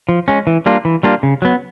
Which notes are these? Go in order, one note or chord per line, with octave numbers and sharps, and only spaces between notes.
F3
G#3 C#4
E3
G3 A#3 D4 F4
E3
G3 A#3 D4 F4
C#3
F#3 B3